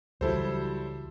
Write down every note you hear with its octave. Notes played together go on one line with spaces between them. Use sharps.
C#2 E3 F#3 G3 E4 A4 C5